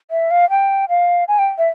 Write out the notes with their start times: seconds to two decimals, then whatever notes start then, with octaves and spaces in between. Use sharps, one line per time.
0.11 E5
0.31 F5
0.50 G5
0.89 F5
1.28 G#5
1.39 G5
1.58 E5